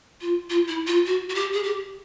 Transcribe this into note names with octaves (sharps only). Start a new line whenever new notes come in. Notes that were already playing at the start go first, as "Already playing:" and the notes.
F4
F4
E4
F4
F#4
F#4
G4
G#4
G4